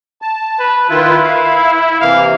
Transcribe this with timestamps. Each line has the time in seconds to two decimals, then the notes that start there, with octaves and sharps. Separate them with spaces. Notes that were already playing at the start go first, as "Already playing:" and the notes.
0.22 A5
0.60 B4
0.90 D#3 E4 F4 B4
1.22 F5
2.01 C3 E3 A#3 F5